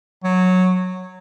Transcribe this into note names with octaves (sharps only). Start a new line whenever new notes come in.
F#3